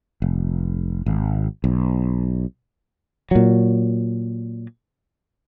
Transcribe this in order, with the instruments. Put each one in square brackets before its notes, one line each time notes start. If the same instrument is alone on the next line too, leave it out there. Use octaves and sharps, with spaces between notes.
[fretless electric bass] F1
G#1
B1
A#2 F#3